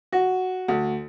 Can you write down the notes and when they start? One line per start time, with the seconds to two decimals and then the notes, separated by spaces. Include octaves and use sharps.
0.12 F#4
0.68 D2